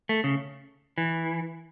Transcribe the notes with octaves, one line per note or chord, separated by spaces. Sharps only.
A3
C#3
E3